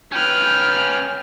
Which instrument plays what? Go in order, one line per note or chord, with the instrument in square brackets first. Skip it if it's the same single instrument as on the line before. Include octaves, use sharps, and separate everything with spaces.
[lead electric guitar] C#4 B4 [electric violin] G5 F6